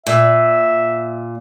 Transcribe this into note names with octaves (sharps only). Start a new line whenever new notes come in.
A#2 E5